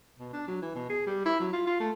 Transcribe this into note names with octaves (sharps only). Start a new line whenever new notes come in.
B2
D4
F#3
E3
B2
G#4
G3
E4
F#3
F4
F4
A3